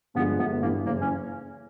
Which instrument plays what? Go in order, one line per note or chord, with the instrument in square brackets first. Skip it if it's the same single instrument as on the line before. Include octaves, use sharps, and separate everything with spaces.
[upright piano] G2 D3 F3 G#3 [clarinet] B3
[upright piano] G1 [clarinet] B3
[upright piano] G2 E3 [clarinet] A#3
[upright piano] F#1 [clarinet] A#3
[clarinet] C#4